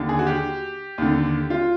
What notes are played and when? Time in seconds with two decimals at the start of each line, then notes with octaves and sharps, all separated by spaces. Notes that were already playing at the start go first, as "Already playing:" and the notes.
Already playing: D#2 D3
0.09 G#4
0.19 F#4
0.27 G4
0.98 D#2 D3
1.50 F4